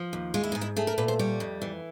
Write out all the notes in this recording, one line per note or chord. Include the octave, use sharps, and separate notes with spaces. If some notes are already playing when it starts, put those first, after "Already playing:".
Already playing: F3
D#2
G#3 F4
E4
G#2 D#4
E4
A3 G#4
A#4
A#2 B4
C5
G3 C#5
F2
E3